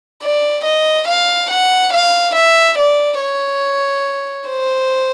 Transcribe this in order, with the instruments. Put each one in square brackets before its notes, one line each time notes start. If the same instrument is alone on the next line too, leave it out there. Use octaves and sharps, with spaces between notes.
[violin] D5
D#5
F5
F#5
F5
E5
D5
C#5
C5